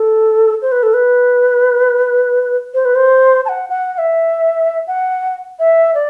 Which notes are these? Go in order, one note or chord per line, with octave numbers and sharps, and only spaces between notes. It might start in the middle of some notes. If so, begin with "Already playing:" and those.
Already playing: A4
C5
B4
A4
B4
C5
B4
C5
A5
F#5
F#5
F#5
E5
F#5
E5
D5